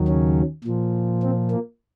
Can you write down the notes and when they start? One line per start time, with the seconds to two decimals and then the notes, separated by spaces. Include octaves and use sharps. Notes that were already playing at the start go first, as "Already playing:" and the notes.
Already playing: D#2 D#3 F#3
0.08 C#3 C#4
0.64 A#2 F3
1.22 C4
1.51 A#3